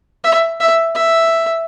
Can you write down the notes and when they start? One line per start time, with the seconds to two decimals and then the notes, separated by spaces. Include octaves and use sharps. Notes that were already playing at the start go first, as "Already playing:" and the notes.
0.24 E5
0.60 E5
0.95 E5